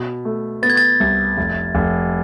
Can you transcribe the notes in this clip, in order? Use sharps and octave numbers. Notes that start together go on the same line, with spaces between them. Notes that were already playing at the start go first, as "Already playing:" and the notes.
Already playing: B2
A3
B3 A6
G#6
A6
C2
F1
F1